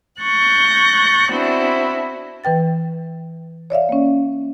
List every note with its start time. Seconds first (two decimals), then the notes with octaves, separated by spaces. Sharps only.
0.21 C#6 F#6 G6 A6 A#6
1.31 B3 C4 D4 E4 F#4
2.44 E3 B4 G5 A6
3.70 C#5 D5 E5 F5
3.89 A#3 C#4